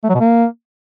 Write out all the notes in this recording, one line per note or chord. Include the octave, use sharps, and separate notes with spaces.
A3
F#3
B2
A#3